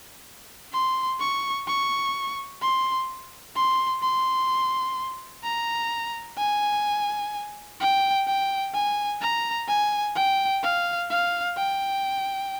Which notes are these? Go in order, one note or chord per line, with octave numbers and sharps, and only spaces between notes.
C6
C#6
C#6
C6
C6
C6
A#5
G#5
G5
G5
G#5
A#5
G#5
G5
F5
F5
G5